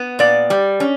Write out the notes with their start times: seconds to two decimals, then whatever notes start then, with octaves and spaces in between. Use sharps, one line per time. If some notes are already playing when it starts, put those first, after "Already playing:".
Already playing: B3
0.19 A#2 D5
0.50 G3
0.80 C#4